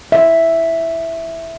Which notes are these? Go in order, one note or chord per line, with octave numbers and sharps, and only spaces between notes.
E5